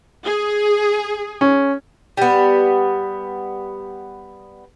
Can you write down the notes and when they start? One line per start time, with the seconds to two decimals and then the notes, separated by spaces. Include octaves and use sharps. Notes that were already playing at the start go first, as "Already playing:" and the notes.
0.25 G#4
1.41 C#4
2.17 G3 B3